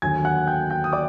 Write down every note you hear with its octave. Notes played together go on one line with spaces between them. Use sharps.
D#2 D3 F#3 G#5 G#6
F#5 F#6
G5 G6
G5 G6
D#6
D5 D6